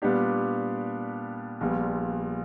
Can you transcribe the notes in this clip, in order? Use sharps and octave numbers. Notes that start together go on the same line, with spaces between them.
A#2 G3 B3 D4 G4
A#1 A#2 G3 B3